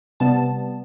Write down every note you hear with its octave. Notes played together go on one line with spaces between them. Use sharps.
C3 G3 B3 A5